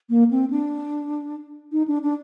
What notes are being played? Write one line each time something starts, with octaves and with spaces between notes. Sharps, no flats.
A#3
C4
D4
D#4
D4
D4